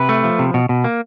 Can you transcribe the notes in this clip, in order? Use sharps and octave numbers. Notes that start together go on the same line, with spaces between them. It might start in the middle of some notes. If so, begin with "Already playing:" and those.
Already playing: C3 B4
A3
F3
C3
B2
B2
A#3